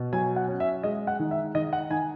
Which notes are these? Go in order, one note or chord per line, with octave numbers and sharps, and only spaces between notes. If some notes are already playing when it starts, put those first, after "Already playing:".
Already playing: B2
F#3 G#5
F#5
C#4
E5
G#3 D#5
F#5
D#3
E5
D#3 D#5
F#5
D#3 G#5